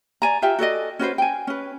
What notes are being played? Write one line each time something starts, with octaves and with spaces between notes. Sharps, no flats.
D5 G#5 A#5
F4 G4 E5 G5
F#4 A4 D5 D#5
C#4 F#4 B4 C5
G5 G#5
C#4 B4